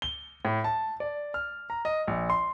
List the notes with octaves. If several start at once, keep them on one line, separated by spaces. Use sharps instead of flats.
G7
A2
A5
D5
F6
A#5
D#5
A#1
C6